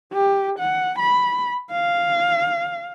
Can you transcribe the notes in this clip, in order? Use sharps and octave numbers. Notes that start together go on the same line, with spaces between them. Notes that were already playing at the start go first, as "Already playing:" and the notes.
G4
F#5
B5
F5